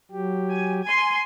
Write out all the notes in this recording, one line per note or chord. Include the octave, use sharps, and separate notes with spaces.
F#3 G4
G#5
G#5 C6